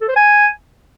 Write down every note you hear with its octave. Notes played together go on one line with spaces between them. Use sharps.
A4
C5
G#5